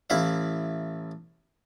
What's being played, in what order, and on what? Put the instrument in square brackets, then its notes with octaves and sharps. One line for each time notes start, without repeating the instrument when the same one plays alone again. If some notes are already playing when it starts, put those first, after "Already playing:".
[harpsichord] A1 E4 E5 F5